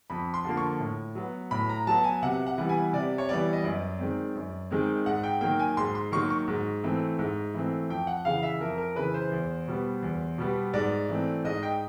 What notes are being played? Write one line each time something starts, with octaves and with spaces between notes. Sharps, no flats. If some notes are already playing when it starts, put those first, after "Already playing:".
F2 B5
C6
D3 F3 A#3
C#6
A2
F#3 B3
A2 B5
A#5
F#3 B3 A5
G#5
C3 F#5
F#5
E3 G3 B3
G#5
C3 D5
C#5
E3 G3 B3 D5
D#5
F#2 D5
D#3 G#3 C4
F#2
D#3 G#3 C4
G#2 F#5
G5
D#3 F#3 A#3 G5
G#5
G#2 C6
C6
D#3 F#3 A#3 C#6
C#6
G#2
E3 A3 C4
G#2
E3 A3 C4
F2 G5
F#5
C#3 E3 F5
E5
F2 A#4
A#4
C#3 E3 B4
C5
E2
B2 G3 B3
E2
B2 G3 B3
G#2 D5
E3 A3 C4
G#2 D#5
G5